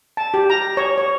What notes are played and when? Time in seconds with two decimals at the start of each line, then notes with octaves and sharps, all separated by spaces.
0.17 A5
0.34 G4
0.50 A#5
0.77 C#5
0.98 C#5